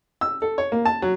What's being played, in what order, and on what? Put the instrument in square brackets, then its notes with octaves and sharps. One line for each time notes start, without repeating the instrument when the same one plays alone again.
[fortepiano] E6
A4
C#5
A#3
A5
F#3